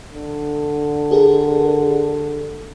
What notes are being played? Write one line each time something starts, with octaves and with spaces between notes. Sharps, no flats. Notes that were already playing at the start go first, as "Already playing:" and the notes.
D3
G4 G#4 A#4